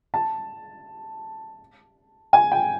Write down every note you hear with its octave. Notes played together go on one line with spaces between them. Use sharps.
A5
G#5
G5